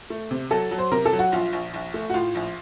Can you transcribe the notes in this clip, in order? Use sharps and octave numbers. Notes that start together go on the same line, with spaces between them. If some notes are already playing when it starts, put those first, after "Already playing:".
A3
C3
F#3 A4
F#3
C5
C3 A#4
A4
F#3
F#4
A#1 F4
A#1
A#1
A3
F#4
A2 F4
A#1